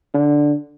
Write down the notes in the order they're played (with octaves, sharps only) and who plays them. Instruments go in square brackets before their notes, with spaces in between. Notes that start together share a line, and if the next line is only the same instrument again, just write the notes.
[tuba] D3